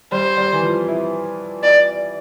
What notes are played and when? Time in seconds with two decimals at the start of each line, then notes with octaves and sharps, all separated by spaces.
0.12 G3 C5
0.38 G3
0.53 E3
0.63 F3
0.88 E4
1.63 D5